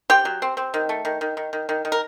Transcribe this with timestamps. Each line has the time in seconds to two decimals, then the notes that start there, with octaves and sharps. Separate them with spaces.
0.10 C4 G4 G5
0.25 F#3
0.42 C4
0.57 C4
0.74 D#3
0.89 A3
1.05 D#3
1.21 D#3
1.37 D#3
1.53 D#3
1.69 D#3
1.85 D#3
1.92 A#4